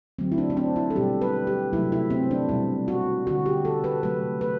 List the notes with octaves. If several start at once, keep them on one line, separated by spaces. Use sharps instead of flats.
D3 F#3 A3 C4
E4
D4
C4
D4
E4
A4
B2 G3 G4
B4
G4
C3 F#3 A3 E4
E4
C4
D4
B2 G3 E4
F#4
D3 A3 F#4
G4
A4
B4
C3 F#3 A3 B4
B4